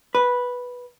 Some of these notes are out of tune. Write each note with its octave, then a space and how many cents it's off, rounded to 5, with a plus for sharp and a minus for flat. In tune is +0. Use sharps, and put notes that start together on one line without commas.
B4 -5